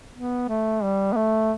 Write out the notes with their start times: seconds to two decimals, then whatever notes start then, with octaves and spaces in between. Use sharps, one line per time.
0.14 B3
0.49 A3
0.83 G3
1.12 B3
1.17 A3